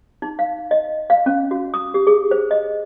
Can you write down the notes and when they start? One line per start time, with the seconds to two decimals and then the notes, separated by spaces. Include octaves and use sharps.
0.22 D#4
0.39 F5
0.71 D#5
1.10 F5
1.26 C#4
1.51 F#4
1.74 D#6
1.94 G4
2.07 G#4
2.31 C5
2.51 D#5